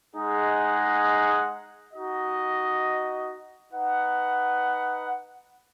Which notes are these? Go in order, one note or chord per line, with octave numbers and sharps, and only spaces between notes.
G#3 D#4 G#4 D#5 F#5
D#4 F#4 D#5
D#4 B4 F#5